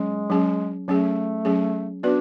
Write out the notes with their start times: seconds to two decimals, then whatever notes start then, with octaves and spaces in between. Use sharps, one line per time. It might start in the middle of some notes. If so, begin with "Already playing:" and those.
Already playing: F#3 G#3 C#4
0.30 F#3 C#4 G#4
0.88 F#3 A3 C#4 G#4
1.45 F#3 C#4 G#4
2.02 B3 D4 F#4 B4 D5